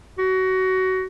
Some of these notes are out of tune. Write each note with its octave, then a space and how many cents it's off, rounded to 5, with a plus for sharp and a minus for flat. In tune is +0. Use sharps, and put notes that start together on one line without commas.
F#4 +20